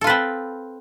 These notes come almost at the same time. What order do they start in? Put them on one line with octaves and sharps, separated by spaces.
A4 F4 B4 C4